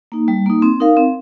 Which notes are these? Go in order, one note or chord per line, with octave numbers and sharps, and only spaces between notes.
A#3 D#4
G3
A#3 D#4
C4
D#4 A#4 F5
C4